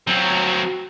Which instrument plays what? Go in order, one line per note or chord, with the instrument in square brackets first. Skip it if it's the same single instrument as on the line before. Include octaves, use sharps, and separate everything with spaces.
[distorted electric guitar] F#3 C4